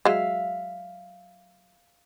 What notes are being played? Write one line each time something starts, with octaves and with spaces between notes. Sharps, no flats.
F#3 G#3 E5 F5